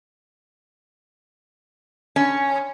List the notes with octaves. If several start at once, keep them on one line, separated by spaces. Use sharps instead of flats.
C#4